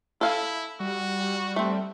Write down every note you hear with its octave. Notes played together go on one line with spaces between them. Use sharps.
E4 A4 F5 G#5
G3 F#4
A3 C4